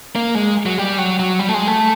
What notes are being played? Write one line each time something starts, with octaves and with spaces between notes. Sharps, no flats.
A#3
G#3
F#3
G3
F#3
F#3
G3
A3
G#3
A3